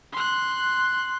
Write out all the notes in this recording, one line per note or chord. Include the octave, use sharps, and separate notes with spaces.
C6 F#6